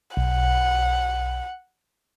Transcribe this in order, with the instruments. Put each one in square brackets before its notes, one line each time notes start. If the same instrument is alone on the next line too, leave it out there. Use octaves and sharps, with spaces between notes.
[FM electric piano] B1 [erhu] F#5